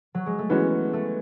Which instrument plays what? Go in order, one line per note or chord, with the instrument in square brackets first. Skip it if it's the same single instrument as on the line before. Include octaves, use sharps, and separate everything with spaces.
[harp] F#3
G#3
A3
[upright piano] E3 G#3 C#4 F#4 [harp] B3
[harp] A3